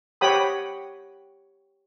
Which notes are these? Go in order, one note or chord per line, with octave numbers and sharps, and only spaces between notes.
G4 C#5 F#5 G5 B5 D#6